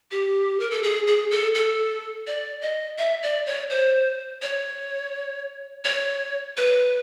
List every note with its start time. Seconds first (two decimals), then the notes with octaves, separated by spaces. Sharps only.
0.11 G4
0.60 A#4
0.71 A4
0.83 G#4
1.07 G#4
1.31 A4
1.55 A4
2.27 D5
2.62 D#5
2.98 E5
3.23 D5
3.46 C#5
3.70 C5
4.42 C#5
5.85 C#5
6.57 B4